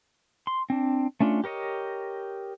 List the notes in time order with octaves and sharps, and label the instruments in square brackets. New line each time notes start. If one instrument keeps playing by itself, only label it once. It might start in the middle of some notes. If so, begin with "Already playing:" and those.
[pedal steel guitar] C6
C4 D4
A3 C#4 D4 F4
G4 A#4 C#5 D#5